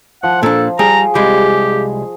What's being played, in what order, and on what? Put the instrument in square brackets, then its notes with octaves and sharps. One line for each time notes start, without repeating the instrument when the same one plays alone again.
[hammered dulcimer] F3 [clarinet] F#5
[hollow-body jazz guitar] A#2 D4 [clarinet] A4
[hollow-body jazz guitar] G3 [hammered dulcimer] G#4 [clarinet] A#5
[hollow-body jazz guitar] C2 G3 G#3 [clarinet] G4